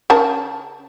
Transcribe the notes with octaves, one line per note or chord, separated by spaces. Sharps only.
C#3 A#4 A5